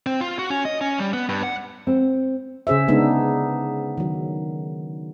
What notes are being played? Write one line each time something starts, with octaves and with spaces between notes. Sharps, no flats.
C4
F4
F#4
C#4
D#5
C#4
G3
B3
G2
F#5
C4
C#3 C#4 G#4 C5 E5
D3 G#3 B3 D4 D#4
D#3 F#3